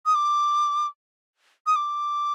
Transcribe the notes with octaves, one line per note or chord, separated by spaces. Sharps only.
D#6
D6
D#6
D6